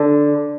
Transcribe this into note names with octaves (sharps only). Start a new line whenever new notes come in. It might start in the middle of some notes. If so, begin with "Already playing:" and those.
Already playing: D3